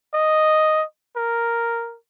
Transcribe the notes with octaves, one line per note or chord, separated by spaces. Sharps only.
D#5
A#4